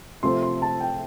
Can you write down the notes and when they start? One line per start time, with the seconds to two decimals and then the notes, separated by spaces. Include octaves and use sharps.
0.23 C3 F3 A3 C4 A4 C6
0.43 C6
0.62 A5
0.81 G5